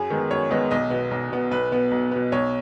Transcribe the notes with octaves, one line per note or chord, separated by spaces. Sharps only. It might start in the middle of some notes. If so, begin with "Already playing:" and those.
Already playing: F#2 G#4
D#3 G#3 B3
F#2 C#5
D#3 G#3 B3 D#5
B1 D#5
B2 B3
B1
B2 B3
B1 B4
B2 B3
B1
B2 B3
B1 C#5